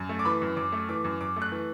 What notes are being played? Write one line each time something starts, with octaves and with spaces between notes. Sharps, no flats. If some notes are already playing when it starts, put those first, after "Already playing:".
Already playing: F#2
A3
D6
E3 B5
F#2
F#2 D6
A3
E3 D6
F#2
F#2 D6
A3
F#6
E3